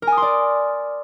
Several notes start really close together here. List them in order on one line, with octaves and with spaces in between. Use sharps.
A#4 G#5 D#6 C6 D5